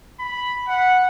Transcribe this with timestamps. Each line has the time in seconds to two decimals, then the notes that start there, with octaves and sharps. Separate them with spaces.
0.20 B5
0.68 F#5